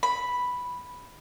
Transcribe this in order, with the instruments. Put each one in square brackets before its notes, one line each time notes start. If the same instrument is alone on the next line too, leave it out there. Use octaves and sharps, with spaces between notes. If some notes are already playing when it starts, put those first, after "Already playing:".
[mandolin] B5